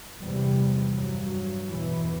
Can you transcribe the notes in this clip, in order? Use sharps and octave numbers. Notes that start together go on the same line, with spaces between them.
E2 C3 G3
G2 F#3
E2 B2 E3